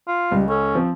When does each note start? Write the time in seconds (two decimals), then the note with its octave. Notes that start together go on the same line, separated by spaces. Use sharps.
0.08 F4
0.32 C#2 G3
0.49 C#4 A4
0.75 F3 C4